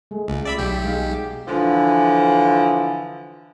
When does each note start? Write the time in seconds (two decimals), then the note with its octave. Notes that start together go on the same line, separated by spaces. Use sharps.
0.11 G#3 A3 G#4
0.28 C#2
0.45 D5 E5 B5
0.58 B1 G4
0.84 G#3 D#4 F5
1.47 D3 E3 F3